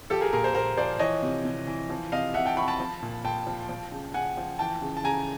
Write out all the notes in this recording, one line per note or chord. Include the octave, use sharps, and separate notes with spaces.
F3 G4 A4
G#4 A#4
A#2 G#4 A#4
A#4 C5
A#2 A#4 C5
F3 C5 D5
E3 C#5 D#5
C3
C3
E3
F3
C3 D#5 F5
C3 E5 F#5
G5 A5
F3 B5 C#6
A5 B5
F3
A#2
A#2 G5 A5
F3
F3
C#3
C#3 F#5 G#5
F3
E3 G5 A5
C#3
A5
C#3 G#5 A#5